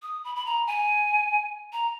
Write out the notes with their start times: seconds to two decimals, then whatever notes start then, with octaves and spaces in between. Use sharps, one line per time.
0.03 D#6
0.24 B5
0.36 B5
0.46 A#5
0.67 G#5
1.73 A#5